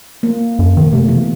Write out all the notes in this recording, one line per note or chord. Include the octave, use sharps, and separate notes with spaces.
A#3
F#2
B2 D#3 A#3
C3 A3
E3